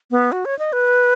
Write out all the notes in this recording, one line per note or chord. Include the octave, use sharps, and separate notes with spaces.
B3
F#4
C#5
D#5
B4